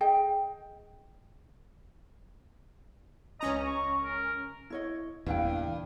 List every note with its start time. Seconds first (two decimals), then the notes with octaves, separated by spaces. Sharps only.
0.01 G#4 D#5 G5
3.41 C#2 C#4 D#5 A#5
3.67 C#6
4.04 A#4
4.70 E4 C#5 D#5
5.26 F#1 E2 G2 A#2 E4 F5 G5